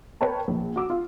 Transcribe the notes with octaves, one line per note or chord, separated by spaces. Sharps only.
A#4 B4 C#5 G5 A5
A#1
F#4 D6 E6
F4